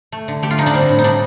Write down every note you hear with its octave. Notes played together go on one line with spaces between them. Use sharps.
A3
D3
A3 G4
F4
D3 D#4
D4
G3 C4
A2
D#4
G3 D4